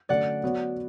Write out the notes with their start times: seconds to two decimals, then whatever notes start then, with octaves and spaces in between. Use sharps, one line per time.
0.09 D3 F#3 A3 C#4 D5 F#5
0.43 F#3 B3 F#4 C#5